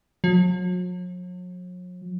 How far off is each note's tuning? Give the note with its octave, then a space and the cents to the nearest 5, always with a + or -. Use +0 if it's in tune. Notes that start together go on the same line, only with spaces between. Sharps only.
F#3 -45